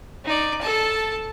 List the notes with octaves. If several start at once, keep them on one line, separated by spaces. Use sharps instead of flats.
D#4 D5
A4 A5